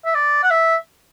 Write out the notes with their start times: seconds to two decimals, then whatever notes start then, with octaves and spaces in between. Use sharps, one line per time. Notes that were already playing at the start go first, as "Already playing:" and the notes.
0.06 E5
0.15 D5
0.43 F#5
0.51 E5